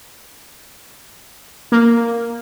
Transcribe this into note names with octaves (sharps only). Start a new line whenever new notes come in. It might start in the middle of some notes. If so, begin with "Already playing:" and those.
A#3